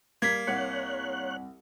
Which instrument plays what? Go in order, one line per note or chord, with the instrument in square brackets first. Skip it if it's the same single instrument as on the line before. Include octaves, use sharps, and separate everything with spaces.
[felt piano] G3 [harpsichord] A#3 [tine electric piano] G#6 B6
[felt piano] C2 F#5 C#7 [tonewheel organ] C#5 F#6